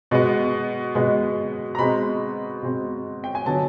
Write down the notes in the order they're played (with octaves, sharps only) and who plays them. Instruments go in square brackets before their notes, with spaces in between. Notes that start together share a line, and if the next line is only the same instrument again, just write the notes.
[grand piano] B2 G#3 B3
B2 G#3 B3
A#5
B2 G#3 C4 B5
B2 G#3 C4
G5
G#5
D3 F#3 B3 A5